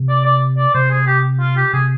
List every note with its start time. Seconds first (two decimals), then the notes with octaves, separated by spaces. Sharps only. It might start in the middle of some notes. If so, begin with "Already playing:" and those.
Already playing: C3
0.09 D5
0.25 D5
0.58 D5
0.75 C3 C5
0.91 G#4
1.07 G4
1.41 F4
1.57 G4
1.73 C3 G#4